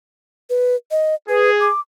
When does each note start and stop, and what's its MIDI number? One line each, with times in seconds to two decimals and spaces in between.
0.50 0.76 71
0.91 1.15 75
1.29 1.69 68
1.29 1.50 71
1.61 1.80 86